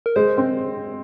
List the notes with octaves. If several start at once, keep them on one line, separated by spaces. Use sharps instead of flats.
A#4
G#3 C5
C4